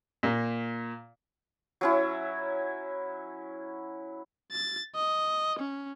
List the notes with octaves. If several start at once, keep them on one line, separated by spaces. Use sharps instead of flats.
A#2 A#3
F#3 C#4 E4
A6
D#5
C#4